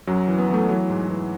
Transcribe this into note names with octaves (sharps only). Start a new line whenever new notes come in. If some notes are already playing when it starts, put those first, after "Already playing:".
F#2 F#3
E3
B3
E3 A3
E3 F#3
G#2
E3